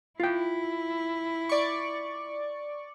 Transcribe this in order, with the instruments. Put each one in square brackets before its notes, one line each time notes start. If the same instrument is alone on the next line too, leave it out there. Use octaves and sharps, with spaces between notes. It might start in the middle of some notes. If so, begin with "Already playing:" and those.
[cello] E4 [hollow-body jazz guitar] F4 G5
[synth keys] D5 C#6